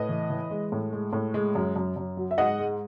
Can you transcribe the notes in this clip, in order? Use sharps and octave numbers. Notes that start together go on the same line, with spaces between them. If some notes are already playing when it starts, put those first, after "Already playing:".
Already playing: A2 B4 D#5
E3
E3
G#3
A2
G#3
A2
G#3
F#2
F#2
F#2
F#3
E5
G#2 D#5 F#5
G#3